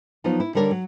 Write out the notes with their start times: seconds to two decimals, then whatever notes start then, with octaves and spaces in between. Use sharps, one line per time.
0.24 F3 F#3 B3 D#4 F4
0.40 E4
0.55 D3 G3 D4 A#4 C#5
0.71 F#3